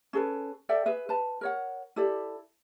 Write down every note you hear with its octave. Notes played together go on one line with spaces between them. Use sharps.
C#4 G#4 A4 B4
A4 D5 E5 G5
G#4 B4 E5
B4 A5
A#4 C#5 F#5
E4 G4 A4 D5